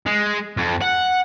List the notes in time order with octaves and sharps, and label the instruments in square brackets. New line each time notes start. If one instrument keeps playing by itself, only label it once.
[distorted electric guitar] G#3
F2
F#5